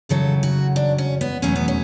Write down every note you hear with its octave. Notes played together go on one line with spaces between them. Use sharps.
F#2 C#3 F#3 A4
F#4
D4
C#4
B3
E2 B2 F#3 A3 C#4
B3
C#4